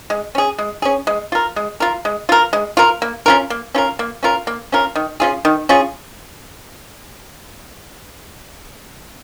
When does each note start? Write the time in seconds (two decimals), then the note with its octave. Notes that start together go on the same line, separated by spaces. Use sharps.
0.10 G#3
0.35 C#4 G#4
0.59 G#3
0.82 C#4 G#4
1.07 G#3
1.32 F4 A#4
1.56 G#3
1.80 F4 A#4
2.05 G#3
2.29 F4 A#4
2.53 G#3
2.77 F4 A#4
3.02 A#3
3.26 C#4 F4 A#4
3.50 A#3
3.75 C#4 F4 A#4
3.99 A#3
4.23 C#4 F4 A#4
4.47 A#3
4.72 C#4 F4 A#4
4.96 D#3
5.20 C#4 F4 G#4
5.45 D#3
5.69 C#4 F4 G#4